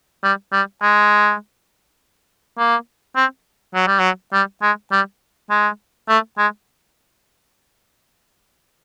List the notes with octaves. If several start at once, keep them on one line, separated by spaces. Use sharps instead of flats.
G3
G3
G#3
A#3
C4
F#3
G3
F#3
G3
G#3
G3
G#3
A3
G#3